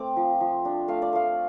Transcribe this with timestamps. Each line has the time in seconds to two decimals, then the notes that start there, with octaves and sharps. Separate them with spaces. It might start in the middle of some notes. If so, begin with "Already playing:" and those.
Already playing: A3 C4 D6
0.16 F3
0.40 F3
0.65 D4
0.88 A3 F5
1.02 D5
1.13 A3 F5